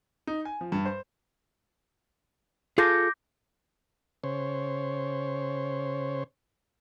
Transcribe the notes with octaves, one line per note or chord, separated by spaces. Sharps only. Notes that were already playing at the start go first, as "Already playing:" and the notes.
D#4
G#5
F3
G2
C5
F4 G#4 A4 D6 G6 A#6
C#3 C5 C#5